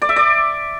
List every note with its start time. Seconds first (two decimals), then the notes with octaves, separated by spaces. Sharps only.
0.02 D5
0.09 E5
0.16 D5